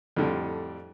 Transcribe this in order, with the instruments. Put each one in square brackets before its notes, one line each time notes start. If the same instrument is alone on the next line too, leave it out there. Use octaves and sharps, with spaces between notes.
[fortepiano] F2 A2 D3 G3